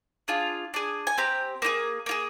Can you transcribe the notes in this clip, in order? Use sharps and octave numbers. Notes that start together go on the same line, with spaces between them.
D4 F4 G#4
D4 G#4
G#5
C4 G4 A#5
A#3 D#4 G#4
A#3 F4 G#4